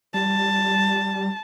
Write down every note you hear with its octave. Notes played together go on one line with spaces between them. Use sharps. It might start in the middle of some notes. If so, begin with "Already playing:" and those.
G3 A5